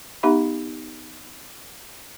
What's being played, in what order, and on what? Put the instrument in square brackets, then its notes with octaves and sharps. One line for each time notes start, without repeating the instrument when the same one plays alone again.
[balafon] B3 D#4 G4 E5 B5